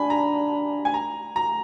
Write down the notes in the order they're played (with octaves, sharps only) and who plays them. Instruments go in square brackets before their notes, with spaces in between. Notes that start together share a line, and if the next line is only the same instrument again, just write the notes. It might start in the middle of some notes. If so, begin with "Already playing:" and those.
Already playing: [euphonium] D4 [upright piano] G#5 B5
[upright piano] A#5
G#5
A#5
A#5